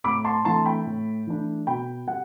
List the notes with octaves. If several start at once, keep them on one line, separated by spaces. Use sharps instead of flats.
A2 B5 D6
A5 C6
E3 A3 D4 A5 C6
G5 B5
A2
E3 A3 D4
B2 G5 B5
G3 F#5